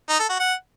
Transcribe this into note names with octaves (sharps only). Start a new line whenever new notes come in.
D#4
A4
F#4
F#5